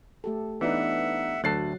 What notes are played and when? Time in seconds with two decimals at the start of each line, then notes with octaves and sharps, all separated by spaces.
0.24 A3 G4 A4
0.61 E3 B3 D4 D#4 E5 F#5
1.44 D2 F#3 A4 F#6 A6 C7